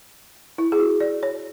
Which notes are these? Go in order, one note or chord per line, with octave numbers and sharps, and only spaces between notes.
E4
G#4
F#4
D5
C#5